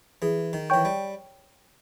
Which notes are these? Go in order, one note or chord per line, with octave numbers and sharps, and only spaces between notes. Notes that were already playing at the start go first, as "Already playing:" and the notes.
E3 G#4
D#3
E3 C#5 G5 C#6 G6
G3